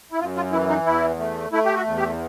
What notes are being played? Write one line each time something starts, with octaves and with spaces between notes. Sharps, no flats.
E4
F#2 F4
F4
E3 E4
D#4
E2 E4
A3
A3 E4
G4
F#4
E2
G4